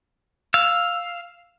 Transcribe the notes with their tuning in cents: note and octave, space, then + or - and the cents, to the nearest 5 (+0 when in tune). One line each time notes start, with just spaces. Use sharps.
F5 +0 E6 +5